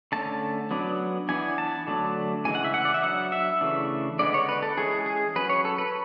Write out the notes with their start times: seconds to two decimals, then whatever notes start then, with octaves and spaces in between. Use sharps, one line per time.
0.12 D3 A3 C#4 A5
0.71 F#3 B3 D4
1.29 E3 B3 D4 G#5
1.58 A5
1.87 D3 F#3 A3 D4
2.45 C#3 E3 G#3 G#5
2.55 F#5
2.64 E5
2.74 F#5
2.85 D5
2.94 E5
3.03 F#3 B3 D4 F#5
3.32 E5
3.61 C#3 E3 A3 D4
4.19 D3 G#3 B3 D4 D5
4.34 C#5
4.49 B4
4.62 A4
4.77 E3 G#3 C#4 G#4
5.06 G#4
5.35 F#3 C#4 B4
5.50 C#5
5.65 A4
5.78 B4